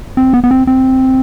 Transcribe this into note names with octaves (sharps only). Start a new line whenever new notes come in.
C4
B3
B3
C4
C4